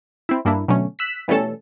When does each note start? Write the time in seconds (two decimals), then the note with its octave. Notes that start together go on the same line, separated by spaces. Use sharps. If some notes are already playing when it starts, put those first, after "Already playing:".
0.29 C4 E4
0.45 G2 A#3 D4 E4
0.68 B2 D3 F#3 A3 C#4
0.99 E6 F#6 B6
1.28 B2 E3 G3 A3 C#4 A4